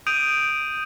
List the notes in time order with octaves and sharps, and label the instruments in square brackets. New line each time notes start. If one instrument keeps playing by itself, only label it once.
[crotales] D#6 G6 D7 D#7 F7